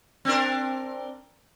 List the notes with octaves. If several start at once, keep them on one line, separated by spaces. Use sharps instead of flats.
C4 D4 A#4